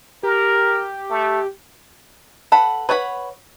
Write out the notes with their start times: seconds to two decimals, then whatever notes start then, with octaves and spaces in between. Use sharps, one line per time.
0.23 G4 A#4
1.10 A3
2.52 A4 B4 F#5 B5
2.89 B4 C#5 F#5 G#5 B5